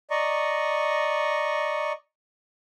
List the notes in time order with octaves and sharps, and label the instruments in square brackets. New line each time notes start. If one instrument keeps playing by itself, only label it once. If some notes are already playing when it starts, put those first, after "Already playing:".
[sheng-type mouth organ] D5 D#5 A#5 C#6